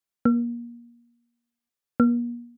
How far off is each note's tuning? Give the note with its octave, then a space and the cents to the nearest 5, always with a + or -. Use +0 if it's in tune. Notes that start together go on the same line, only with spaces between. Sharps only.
A#3 +30
A#3 +40